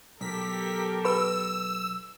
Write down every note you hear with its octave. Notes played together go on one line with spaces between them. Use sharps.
B1 G4 A4 A#4 B6
B4 B5 E6